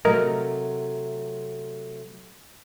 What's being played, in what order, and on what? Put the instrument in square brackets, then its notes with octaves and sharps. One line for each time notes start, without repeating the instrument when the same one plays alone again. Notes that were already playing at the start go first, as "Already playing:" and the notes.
[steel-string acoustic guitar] C3 F#3 A3 [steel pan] A#4 D#5